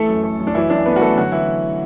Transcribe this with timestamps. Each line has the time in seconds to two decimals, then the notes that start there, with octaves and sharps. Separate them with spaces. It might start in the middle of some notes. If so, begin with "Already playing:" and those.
Already playing: E3 A3 A4
0.09 F#2
0.23 A3
0.39 F#2
0.47 D4
0.55 E3 F#3 E4
0.70 F#2 D4
0.85 A3 B3 B4
0.96 F#4
1.01 F#2 A3 A4
1.16 D3 F#3 F#4
1.32 E3 E4